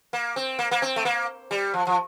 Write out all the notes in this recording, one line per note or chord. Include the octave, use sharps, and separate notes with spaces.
A#3
C4
A#3
A#3
C4
A3
A#3
G3
F3
F3